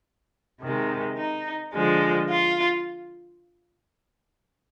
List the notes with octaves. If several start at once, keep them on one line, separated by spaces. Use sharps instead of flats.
C3 D#3 G#3
D#4
D3 F3 G#3
F4